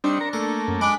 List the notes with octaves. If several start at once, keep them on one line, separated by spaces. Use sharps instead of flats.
G3 C4 D4 D#4 C#7
A#4 A#5
A3 A#3 A4
F#2
G#3 D4 B5 D6